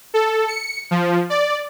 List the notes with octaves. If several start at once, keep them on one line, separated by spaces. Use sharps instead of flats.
A4
C#7
F3
D5